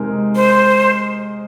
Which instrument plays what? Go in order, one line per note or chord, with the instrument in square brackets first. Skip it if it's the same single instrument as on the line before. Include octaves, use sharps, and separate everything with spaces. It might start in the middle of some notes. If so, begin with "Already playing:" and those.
Already playing: [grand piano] C3 G#3 D#4 A#4
[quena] C5